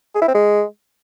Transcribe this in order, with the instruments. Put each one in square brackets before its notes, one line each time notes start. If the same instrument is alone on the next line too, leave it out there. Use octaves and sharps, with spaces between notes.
[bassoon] G#4
E4
C4
G#3